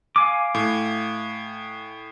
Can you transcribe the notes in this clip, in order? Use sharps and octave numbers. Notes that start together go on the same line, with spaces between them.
F5 G#5 D6
A2